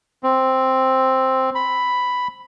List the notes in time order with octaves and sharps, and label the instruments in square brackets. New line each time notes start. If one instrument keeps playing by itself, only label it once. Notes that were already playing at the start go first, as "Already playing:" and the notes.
[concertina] C4
B5